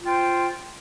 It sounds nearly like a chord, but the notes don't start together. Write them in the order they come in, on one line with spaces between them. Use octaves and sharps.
F4 G5 C5